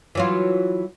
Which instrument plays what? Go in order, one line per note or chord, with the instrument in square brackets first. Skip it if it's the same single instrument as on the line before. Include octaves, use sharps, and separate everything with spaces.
[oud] E3 F#3 F4